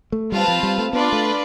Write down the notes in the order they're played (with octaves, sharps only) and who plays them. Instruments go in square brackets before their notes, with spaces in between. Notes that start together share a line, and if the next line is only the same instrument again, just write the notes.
[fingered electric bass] A3
[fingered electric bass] G3 [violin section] C4 F4 B4 F5 A5
[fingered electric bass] F3
G3
A3
[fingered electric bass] B3 [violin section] D4 F4 B4 D5
[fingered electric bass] A3